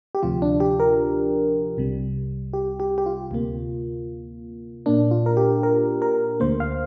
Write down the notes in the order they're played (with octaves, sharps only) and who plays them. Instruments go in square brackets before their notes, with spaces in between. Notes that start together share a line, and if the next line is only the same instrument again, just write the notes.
[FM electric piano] G4
D2 C3 F3 F4
D4
G4
A#4
C2 C3 G3
G4
G4
G4
F4
D2 C3 A#3
A#2 A#3 D4
F4
A#4
G4
A#4
A#4
D2 D3 A#3 C5
F5